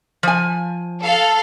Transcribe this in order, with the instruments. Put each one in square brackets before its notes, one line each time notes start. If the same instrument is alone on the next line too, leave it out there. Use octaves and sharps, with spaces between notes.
[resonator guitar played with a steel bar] F3 G#5
[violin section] A4 F5